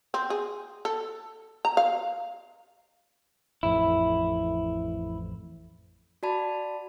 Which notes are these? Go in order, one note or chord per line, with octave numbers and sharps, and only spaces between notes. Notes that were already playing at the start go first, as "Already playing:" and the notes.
C4
G#4
A4
A#5
F5
A1 F2 E4
F#4 D5 A5 B5